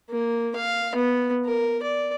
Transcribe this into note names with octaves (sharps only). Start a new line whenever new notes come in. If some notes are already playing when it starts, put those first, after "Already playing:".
A#3
F5
B3
A#4
D5